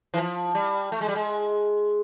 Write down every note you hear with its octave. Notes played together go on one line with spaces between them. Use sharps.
E3
F3
G3
A3
G#3
G3
G#3